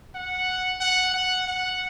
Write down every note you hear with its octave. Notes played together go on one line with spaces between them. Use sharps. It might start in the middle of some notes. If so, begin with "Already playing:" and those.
F#5
F#5
F#5
F#5